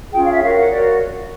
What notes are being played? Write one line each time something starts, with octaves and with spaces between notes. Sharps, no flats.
C#4 F4 G#4 G5
F5
E5
F#4 A#4 C#5 F5
F#5
F#4 A#4 C#5 D5